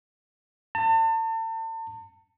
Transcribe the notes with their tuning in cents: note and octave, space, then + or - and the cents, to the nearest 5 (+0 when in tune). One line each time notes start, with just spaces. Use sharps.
A5 +35